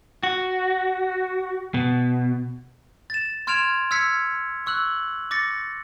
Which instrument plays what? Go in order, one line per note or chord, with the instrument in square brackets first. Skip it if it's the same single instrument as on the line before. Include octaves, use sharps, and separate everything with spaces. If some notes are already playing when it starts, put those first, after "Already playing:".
[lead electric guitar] F#4
B2
[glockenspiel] A6 E7
C6 F6 G#6 D7 E7 F7
E6 F6 G#6 B6 C#7
C#6 E6 F#6 F#7
D6 A6 A#6 C#7